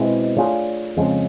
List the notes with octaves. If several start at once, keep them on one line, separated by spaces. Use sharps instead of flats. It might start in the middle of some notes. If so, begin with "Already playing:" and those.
Already playing: B2 G#3 C4 E4
A3 D4 F4 G#4 C#5
F2 C#3 F3 G#3